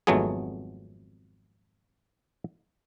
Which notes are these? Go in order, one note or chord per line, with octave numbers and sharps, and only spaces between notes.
G#1 F2 F#3 A3 B3 G#4